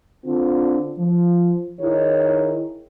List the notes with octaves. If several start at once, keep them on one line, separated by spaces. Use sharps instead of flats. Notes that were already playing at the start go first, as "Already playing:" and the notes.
D3 C4 D4 F4
F3
D#3 D#4 E4 G#4 C#5